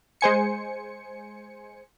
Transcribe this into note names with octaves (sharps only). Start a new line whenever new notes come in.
G#3 C5 G#5 C#7